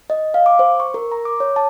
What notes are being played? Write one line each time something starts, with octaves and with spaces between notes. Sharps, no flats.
D#5
F5
D6
C5
C#6
A#4
A#5
D6
C#5
A5